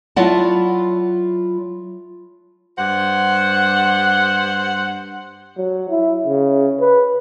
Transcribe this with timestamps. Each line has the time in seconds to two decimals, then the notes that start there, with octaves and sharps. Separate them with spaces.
0.16 F#3 E4 F4 D5 F#5 A5
2.78 G2 C5 F#5
5.58 F#3
5.90 E4
6.26 C#3
6.80 B4